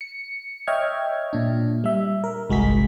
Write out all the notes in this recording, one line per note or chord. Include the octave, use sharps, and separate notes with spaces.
C#7
C#5 D#5 E5 G5 F6 G#6
A#2 D4
G3 E5
A#4
G1 C2 G#3 F#4 G#4 B6